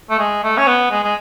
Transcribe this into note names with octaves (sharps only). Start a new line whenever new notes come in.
A3
G#3
A3
C#4
B3
G#3
G#3